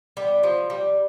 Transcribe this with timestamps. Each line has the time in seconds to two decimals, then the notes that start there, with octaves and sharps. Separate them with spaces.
0.17 G3 B3
0.43 F3
0.70 G3